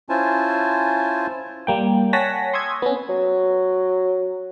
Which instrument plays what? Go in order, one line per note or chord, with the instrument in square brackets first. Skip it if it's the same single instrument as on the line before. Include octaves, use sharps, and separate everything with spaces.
[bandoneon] C#4 E4 F4 C5 G#5 A5
[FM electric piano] G3 A#3 G5
C#5 F#5 G#5 A5 A#6 B6
C6 C#6 D#6 E6 G#6
B3 C#4
[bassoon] F#3